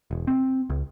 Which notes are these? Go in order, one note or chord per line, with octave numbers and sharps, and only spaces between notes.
E1
C4
C#2